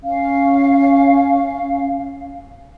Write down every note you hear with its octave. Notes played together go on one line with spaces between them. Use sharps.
C#4 F5